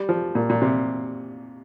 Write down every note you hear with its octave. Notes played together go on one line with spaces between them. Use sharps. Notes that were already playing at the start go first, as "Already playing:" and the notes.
Already playing: G3
F3
A#2
A#2
C3